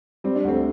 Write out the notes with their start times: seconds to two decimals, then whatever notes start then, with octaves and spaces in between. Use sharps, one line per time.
0.24 G3 C4
0.35 D4
0.44 D2 A3 C4